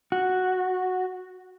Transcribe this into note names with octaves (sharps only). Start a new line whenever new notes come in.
F#4